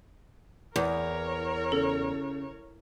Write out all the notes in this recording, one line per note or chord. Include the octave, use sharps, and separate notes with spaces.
E2 A#4 C#5
C#3 A4